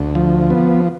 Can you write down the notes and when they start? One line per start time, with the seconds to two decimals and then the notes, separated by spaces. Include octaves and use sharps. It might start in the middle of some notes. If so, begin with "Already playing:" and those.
Already playing: D2
0.15 F3
0.50 B3